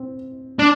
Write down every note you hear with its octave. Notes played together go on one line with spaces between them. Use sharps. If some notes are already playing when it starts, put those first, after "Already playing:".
Already playing: C4
D4